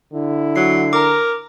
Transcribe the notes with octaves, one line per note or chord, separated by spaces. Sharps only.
D3 E4
F#3 C7
A#4 A#5 D6